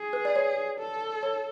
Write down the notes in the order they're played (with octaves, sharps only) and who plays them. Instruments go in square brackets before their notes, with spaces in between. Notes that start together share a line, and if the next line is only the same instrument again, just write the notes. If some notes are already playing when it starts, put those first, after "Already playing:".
Already playing: [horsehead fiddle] G#4
[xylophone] B4
D5
C#5
[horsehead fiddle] A4
[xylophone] C#5